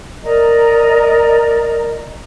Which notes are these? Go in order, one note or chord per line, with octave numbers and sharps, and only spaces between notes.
A#4 D5 D#5 A#5